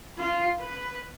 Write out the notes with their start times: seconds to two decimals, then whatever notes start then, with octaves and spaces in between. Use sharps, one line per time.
0.18 F4
0.60 B4